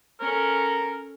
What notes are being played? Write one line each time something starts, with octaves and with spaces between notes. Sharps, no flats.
C#4 A4 A#4